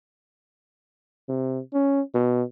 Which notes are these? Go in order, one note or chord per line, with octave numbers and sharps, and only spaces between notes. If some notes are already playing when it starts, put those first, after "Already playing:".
C3
C#4
B2